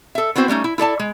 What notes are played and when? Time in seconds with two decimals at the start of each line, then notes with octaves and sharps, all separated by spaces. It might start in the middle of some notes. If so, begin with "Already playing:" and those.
0.15 A4 E5
0.36 B3 C4 E4 F#4 C5
0.48 G3 A3 C#4 D#4
0.64 E4
0.78 E4 A4 D5 A5
0.99 G#3